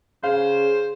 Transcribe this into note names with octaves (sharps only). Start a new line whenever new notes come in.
C#3 G#4 C5 F5